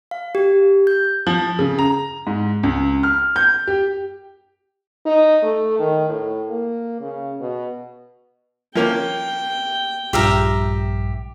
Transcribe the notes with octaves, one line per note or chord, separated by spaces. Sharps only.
F5
G4
G6
F3
C#3
A#5
G#2
C#2
F6
G6
G4
D#4
A3
D#3
A2
A#3
C#3
B2
F3 A#3 C#4 G5
A#1 G2 F4 G4 E5 A#5